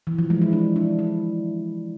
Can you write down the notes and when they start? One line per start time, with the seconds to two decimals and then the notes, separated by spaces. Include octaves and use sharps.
0.07 E3
0.19 F3
0.30 G#3
0.42 E4
0.53 D4
0.76 D4
0.99 E4